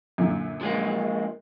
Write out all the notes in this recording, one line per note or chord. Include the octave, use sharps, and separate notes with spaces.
F#2 A#2 D3
F3 G#3 A#3